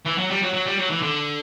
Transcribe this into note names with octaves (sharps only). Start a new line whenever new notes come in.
E3
F#3
G3
F#3
F#3
G3
F#3
E3
D3